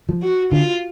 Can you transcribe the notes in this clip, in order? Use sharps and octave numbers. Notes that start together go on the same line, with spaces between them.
F3
F#4
D3 F4